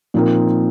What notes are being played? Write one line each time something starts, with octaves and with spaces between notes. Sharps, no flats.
A#2 F3 C4 D#4 A#4